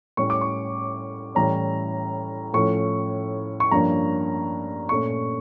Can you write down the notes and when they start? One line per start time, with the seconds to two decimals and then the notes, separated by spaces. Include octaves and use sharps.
0.17 A2 G3 C#4 C#6
0.30 D6
0.41 C#6
1.35 A2 E3 G3 C#4 A#5
2.54 A2 F3 A3 C#4 C#6
3.60 C#6
3.71 G2 F3 A#3 C#4 A#5
4.89 A#2 A3 C#4 C#6